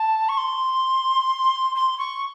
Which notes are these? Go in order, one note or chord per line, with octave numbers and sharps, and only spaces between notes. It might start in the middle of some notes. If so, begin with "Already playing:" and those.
Already playing: A5
C#6
C6
C6
C#6